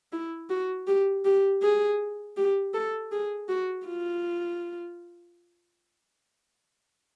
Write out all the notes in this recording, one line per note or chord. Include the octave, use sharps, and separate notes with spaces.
E4
F#4
G4
G4
G#4
G4
A4
G#4
F#4
F4